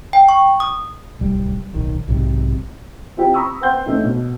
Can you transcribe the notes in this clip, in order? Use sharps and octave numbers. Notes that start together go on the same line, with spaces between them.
G5
C#6
D#6
D1 C2 G3
D1 B1 D#3
B1 G#2 C3
C4 E4 F4 G4
A#5 B5 C#6 D#6 E6
B4 C5 F#5 G5 C6 G6
D3 A3 C#4 D#4
B2